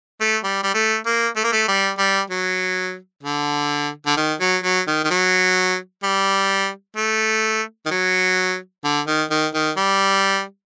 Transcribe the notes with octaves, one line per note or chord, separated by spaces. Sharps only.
A3
G3
G3
A3
A#3
A3
A#3
A3
G3
G3
F#3
D3
D3
D#3
F#3
F#3
D#3
D#3
F#3
G3
A3
D#3
F#3
D3
D#3
D#3
D#3
G3